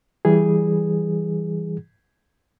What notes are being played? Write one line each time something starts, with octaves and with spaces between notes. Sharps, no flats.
E3 G3 G#4